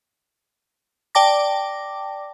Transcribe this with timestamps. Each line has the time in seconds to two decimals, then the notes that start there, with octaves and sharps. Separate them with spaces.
1.15 D5 G5 A5 D6 A#6